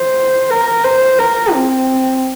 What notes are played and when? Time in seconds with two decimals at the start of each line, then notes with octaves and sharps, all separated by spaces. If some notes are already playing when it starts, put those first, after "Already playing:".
Already playing: C5
0.50 A#4
0.84 C5
1.19 A#4
1.53 C4